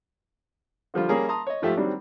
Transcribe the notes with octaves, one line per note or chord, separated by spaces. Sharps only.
D3 F3 G3 F4
G3 A#3 C#4 G#4 A#4
A5 A#5 C6 D#6
C#5 D#5
G#2 F3 A3 F4 G4 E5
D#3 F#3 G3 C4 D4